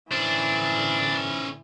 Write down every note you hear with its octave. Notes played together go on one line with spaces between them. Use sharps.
A2 D3 E3 C#4 D4 C5